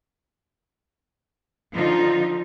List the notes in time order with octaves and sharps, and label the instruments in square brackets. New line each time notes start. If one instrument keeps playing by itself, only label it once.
[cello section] D3 F3 D#4 F4